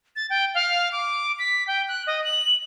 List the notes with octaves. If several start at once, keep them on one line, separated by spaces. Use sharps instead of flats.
A6
G5
F5
D6
B6
G5
F#6
D#5
F#7